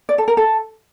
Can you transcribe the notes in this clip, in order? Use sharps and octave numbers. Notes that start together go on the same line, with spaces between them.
D5
A4
A#4
A4